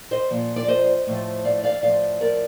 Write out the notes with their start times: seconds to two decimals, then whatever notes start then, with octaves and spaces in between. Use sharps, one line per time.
0.11 C5 D#5
0.30 A#2 F3
0.56 D5
0.68 C5 D#5
1.07 A2 F3
1.45 D5 F5
1.63 D5 F5
1.82 A2 F3 D5 F5
2.21 A#4 D5